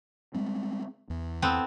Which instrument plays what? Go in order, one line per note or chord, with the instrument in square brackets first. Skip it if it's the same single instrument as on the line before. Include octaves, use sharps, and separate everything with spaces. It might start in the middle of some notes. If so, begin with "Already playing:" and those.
[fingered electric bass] G3 G#3 C4
E2
[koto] B3 C4 A4